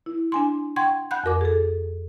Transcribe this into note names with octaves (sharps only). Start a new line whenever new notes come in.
E4
D4 G#5 C6
F#5 G5 C6 C#6 G#6
F#5 B5 F#6 G6
F2 F#4 A#4 D6
G#4 A4